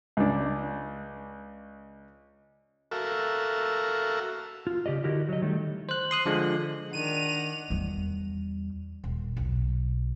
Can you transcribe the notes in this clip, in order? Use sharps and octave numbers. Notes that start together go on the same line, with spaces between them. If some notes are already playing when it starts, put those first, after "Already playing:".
C#2 D4
F#4 A4 A#4 E5 F5
F4
C#3 G4 D5 D#5
D3 E4 F#4 G4 A#4 D#5
F#3 D#5
D#3 G3 A3
C5 F#6
C6 D#6 F#6
D3 F3 G#3
D#3 D4 F#5 D#7 F7
E2 G3
D#1
B1